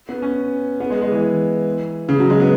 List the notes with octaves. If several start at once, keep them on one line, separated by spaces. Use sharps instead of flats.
B3
C#4
B3
G#3
G#3
E3
C#3
F#3
G#3
B3